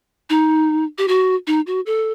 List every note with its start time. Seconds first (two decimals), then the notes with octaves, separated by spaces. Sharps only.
0.30 D#4
0.98 G4
1.08 F#4
1.47 D#4
1.67 F#4
1.86 A4